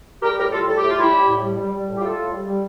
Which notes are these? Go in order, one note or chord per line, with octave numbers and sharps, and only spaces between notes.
G3 G4 A#4
A2 G4 A#4
G3 F4 A4
A2 A4
A2 G4
F4
G3 E4 G4
G3
A2
G3
G3
G3
A2
G4
A2 F4 A4
A2
G3
G3